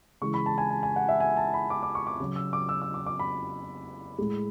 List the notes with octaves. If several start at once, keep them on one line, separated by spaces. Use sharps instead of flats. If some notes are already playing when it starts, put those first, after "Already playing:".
C#3 E3 G#3 C#6
B5
A5
G#5
A5
G#5
F#5
E5
G#5
A5
B5
D6
D6
C#6
D6
C#3 F#3
E6
D6
E6
E6
D6
D6
B5
A2 G#3